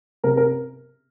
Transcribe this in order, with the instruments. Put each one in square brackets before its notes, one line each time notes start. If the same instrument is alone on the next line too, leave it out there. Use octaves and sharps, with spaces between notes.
[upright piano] C3 A#4
A#4